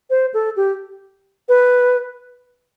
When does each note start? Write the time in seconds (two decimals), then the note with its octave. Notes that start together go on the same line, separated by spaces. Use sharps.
0.10 C5
0.34 A4
0.56 G4
1.49 B4